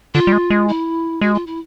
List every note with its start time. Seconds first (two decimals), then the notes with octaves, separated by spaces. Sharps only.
0.14 D3 F4
0.27 G3
0.32 G#3
0.50 G#3
0.68 E4
1.21 G#3 F#4
1.34 F4
1.47 E4